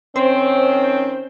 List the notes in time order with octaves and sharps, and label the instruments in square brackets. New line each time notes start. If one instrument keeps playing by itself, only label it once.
[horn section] D#3 C4 [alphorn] C#4 [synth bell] C5